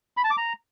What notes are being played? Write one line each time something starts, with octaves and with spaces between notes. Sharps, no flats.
B5
A5
D6
A#5